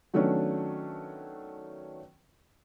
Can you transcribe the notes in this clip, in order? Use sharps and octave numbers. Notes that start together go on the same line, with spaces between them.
D#3 F#3 A3 B3 C#4 D4